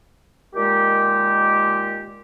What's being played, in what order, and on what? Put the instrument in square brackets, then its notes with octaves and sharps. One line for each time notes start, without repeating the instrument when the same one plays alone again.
[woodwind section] A#2 D#3 G#3 G4